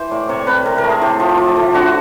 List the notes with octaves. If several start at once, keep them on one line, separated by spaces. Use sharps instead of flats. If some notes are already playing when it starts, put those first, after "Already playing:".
Already playing: E3 C5
A2 D5
C3 C#5
C3 B4
C3 A#4
A#4
A3
G#4
A2 G4
F3
F3
A3
D3 F#4